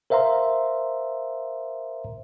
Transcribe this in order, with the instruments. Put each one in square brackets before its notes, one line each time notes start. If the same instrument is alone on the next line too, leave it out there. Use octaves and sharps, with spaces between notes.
[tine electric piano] A#4 C5 E5 F5 A#5 C6